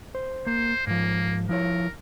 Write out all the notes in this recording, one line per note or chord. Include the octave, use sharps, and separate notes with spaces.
C5
A#3 C5
G#2 F3 A#3
F3 E4 A#4 C#5